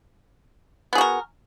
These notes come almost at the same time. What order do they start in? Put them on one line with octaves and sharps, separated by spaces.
B3 G#4 F#4 A#4